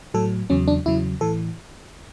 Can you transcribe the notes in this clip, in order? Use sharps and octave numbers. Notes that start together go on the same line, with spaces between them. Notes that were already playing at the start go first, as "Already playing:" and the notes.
A2 F#3 A4
E2 C#3 F#3 C#4
D4
E2 C#3 F#3 E4
A2 E3 A4